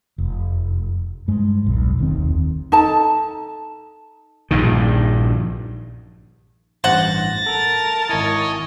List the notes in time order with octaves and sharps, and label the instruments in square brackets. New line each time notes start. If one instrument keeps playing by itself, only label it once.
[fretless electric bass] F1
G2 G#3
D#1 B1
F1 D#2 D#3 C4
[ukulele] D#4 A4 A5
[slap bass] A#1 G2 D#3
[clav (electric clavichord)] A1 G2 [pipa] C5 F#5 [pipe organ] A6 A#6
[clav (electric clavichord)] A4 [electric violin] A#4 A5
[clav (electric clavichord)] G#1 E4 [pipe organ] C#5 D#5 G#5